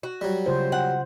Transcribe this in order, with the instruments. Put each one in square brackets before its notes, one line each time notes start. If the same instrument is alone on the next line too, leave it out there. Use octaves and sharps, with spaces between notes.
[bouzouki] F#4
[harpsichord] F#3 G3
[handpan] C#3 F4 C5
[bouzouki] F#5